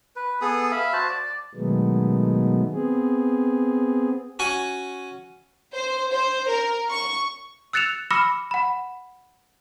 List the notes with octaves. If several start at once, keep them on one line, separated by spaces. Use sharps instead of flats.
B4
B3 G#4 A4 D#6
E5 F5 B5
F#4 C5 A5
D5
B2 D#3 F#3 G#3 A3 B3
B3 C4 G#4
C#4 F#4 F#5 G#5 C#6
C5
C5
A#4
C#6
E6 F#6 A6 C#7 E7 F7
B5 D6 E6 F6 A#6 C#7
F#5 B5